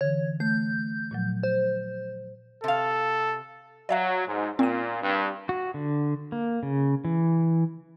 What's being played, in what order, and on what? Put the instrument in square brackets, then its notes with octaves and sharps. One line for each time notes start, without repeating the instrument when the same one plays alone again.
[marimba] D3 E3 [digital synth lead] C#5
[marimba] A3 [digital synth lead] G6
[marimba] A#2 F3 F#3
[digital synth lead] C5
[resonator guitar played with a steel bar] C3 F5 [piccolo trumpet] A4
[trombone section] F#3 [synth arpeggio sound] D5 E5 F5
[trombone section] G#2
[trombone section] A#2 [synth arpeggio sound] C4 D#7
[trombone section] G2
[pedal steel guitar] F#4
D3
A#3
C#3
E3